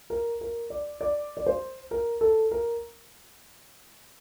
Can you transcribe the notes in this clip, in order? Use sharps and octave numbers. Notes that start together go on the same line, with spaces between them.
A#4
A#4
D5
D5
D5
C5
A#4
A4
A#4